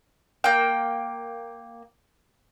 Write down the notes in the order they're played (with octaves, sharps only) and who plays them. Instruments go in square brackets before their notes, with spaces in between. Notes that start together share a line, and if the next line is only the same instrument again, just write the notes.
[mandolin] A#3 G5